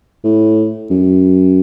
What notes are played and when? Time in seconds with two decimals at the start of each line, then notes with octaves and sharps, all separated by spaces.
0.24 A2
0.90 F#2